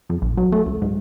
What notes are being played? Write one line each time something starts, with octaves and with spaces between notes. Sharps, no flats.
F2
A#1
F#3
A3
C#2
G#2